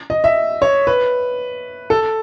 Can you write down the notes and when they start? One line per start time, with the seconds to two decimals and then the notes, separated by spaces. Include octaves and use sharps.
0.10 D#5
0.24 E5
0.62 C#5
0.87 B4
1.90 A4